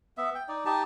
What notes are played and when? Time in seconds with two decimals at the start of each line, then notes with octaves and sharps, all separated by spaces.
0.17 B3 E5
0.35 G5
0.48 D#4 D5
0.65 D#4 G4 A5